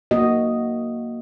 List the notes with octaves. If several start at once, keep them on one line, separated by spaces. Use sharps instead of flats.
A#3 F#4 D#5